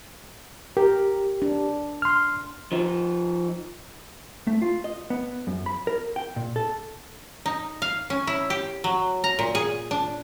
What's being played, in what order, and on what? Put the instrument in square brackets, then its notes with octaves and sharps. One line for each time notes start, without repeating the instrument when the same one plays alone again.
[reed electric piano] G4 [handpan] A#4
[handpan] D4
[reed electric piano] C6 F6
[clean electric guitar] F3 D#4
[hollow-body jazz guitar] A3
F4
D#5
B3
F#2
B5
A#4
G5
A#2
A4
[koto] D#4
F5
C#4
E4
G4
F#3
A#5
A#2
G#4
D4